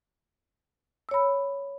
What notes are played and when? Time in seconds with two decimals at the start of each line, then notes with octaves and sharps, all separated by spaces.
1.09 E6
1.11 C#5
1.14 B5